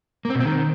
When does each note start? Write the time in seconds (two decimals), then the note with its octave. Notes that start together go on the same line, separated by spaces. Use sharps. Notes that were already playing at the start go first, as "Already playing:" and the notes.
0.25 A#3
0.30 C4
0.35 B2
0.40 C4
0.45 D#3